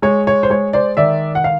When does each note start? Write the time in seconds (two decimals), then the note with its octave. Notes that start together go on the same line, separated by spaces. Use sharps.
0.02 G#3 C#5
0.27 C#5
0.43 C5
0.50 G#3 C#5
0.73 C5 D5
0.97 D#3 D5 E5
1.35 F#5
1.44 F5